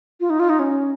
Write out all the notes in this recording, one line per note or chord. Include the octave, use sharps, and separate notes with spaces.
F4
D#4
F4
D#4
C#4